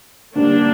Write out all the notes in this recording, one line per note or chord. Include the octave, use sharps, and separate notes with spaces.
D3 G3 A#3 C4 D4